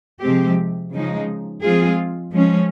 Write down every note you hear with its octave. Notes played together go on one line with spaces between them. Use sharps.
C3 F3 G#3 C4 G4
C#3 F3 G#3 D#4
F3 G#3 C4 F4 G#4
F3 G#3 C#4